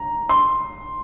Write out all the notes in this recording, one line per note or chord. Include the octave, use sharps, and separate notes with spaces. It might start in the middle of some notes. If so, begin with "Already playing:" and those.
Already playing: A#5
C6